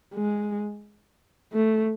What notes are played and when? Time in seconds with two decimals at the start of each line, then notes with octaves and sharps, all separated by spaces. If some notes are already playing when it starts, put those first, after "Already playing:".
0.15 G#3
1.53 A3